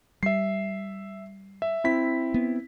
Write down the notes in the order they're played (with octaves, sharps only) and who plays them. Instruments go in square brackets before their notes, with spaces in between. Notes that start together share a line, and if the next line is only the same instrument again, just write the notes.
[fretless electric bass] G3 [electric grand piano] E5 C7
[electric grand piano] E5
C4 E4 B6
[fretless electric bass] B3